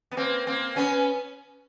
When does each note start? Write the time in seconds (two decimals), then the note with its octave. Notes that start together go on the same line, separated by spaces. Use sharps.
0.11 B3
0.17 A#3 C4
0.47 A#3 C4
0.76 B3 C#4